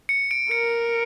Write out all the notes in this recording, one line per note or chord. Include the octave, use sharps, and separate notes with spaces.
C#7
D7
A#4 C#7